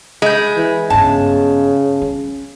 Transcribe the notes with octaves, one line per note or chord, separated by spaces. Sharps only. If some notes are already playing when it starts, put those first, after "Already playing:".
G#3 E4 G6
E3
G2 C#3 B3 A5
C#4